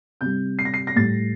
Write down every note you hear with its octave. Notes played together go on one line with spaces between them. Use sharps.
C3 G3 G6
C7
A#6
C7
A#6
A2 G3 A6